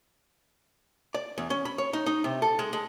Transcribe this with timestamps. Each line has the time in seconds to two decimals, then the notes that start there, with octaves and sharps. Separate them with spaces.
1.15 D5
1.38 E2
1.50 C#4
1.65 B5
1.78 C#5
1.93 D#4
2.06 D#4
2.24 C3
2.42 A4
2.59 G#3
2.73 G#3